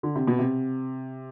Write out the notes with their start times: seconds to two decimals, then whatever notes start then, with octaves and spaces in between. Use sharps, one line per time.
0.03 D3
0.15 C3
0.27 B2
0.39 C3